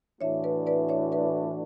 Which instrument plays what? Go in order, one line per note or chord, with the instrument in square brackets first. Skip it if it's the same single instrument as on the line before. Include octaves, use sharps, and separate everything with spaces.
[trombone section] A2 E3 A3 D4 F#4 [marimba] C#5 E5
[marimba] B4 D5
B4 D5
C#5 E5
B4 D5